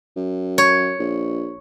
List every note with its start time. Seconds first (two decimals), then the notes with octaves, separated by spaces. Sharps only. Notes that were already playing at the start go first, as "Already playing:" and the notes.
0.16 F#2
0.58 C#5
0.99 A#1